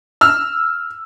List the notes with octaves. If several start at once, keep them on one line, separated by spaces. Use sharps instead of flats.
E6 F6